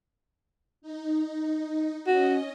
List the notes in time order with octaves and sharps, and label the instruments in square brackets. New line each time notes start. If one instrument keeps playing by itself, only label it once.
[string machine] D#4
[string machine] C#4 D#5 [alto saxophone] F#4